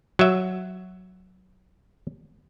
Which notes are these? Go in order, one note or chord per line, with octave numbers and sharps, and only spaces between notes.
F#3 E5